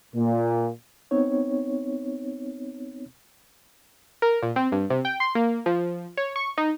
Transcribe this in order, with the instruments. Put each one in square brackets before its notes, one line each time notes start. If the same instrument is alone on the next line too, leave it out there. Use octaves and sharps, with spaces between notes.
[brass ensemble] A#2
[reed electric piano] B3 C4 D#4 C#5
[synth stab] A#4
A#2
C4
G2
C3
G5
C6
A#3
F3
C#5
C#6
D#4